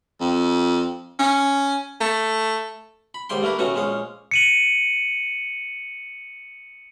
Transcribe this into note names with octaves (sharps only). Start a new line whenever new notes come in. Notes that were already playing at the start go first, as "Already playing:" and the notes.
F2
C#4
A3
B5
D#2 G#2 G3 G5 C6
G2 A3 A#3 A#4 B4
B2 D#3 A3 C#4 F#4
A#1 G#3 C#4 F5
C#7 D#7 F#7